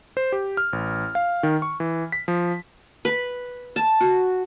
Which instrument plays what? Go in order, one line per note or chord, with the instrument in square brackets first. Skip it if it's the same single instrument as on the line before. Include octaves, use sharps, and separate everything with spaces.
[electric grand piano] C5
G4
F6
A1
F5
D#3
C#6
E3
B6
F3
[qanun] B4
A5
F#4